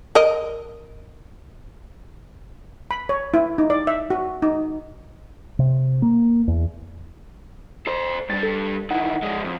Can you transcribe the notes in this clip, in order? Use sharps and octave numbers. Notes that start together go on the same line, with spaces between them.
A#4 D#5
B5
C#5
E4
D#4
D5
E5
F#4
D#4
C3
A#3
E2
A4 C5
G2 G3 A6
A4
D#3 E3 F#5
F3 G#3
F2